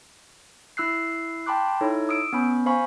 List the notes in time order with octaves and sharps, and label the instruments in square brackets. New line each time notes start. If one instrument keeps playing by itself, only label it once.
[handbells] E4 E6 F#6 C7
G5 A5 B5 C6 D6 F#6
D#4 E4 A4 C#5
D#6 E6 D7
B3 C#4 B5
C5 F5 G#5 B5 C#6